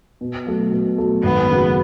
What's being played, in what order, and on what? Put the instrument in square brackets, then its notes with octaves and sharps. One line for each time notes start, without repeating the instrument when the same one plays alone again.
[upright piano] B2
F#3 A3
B2
F#3 A3
[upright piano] G#1 [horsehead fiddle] B3
[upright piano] F#2 C#3 F#3